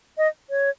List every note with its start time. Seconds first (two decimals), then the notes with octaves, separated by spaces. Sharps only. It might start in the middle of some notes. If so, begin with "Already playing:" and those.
0.18 D#5
0.50 C#5